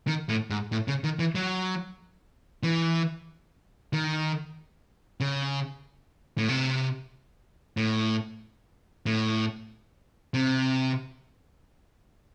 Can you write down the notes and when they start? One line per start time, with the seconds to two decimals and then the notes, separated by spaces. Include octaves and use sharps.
0.07 D#3
0.29 A2
0.50 G#2
0.72 A2
0.88 C#3
1.04 D#3
1.19 E3
1.35 F#3
2.63 E3
3.93 D#3
5.20 C#3
6.38 A2
6.49 C3
7.77 A2
9.06 A2
10.34 C3